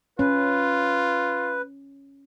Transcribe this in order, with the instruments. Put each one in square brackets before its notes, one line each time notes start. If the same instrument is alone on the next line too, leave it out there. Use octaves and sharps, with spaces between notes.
[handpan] C#4 [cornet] F4 [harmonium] B4